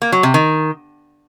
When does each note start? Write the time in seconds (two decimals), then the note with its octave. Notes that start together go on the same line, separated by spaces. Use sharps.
0.02 A#3
0.12 F#3
0.23 C3
0.34 D#3